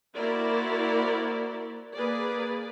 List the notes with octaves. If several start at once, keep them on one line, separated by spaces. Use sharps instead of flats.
A#3 E4 F#4 A#4 C5 D5
A#3 G#4 B4 D5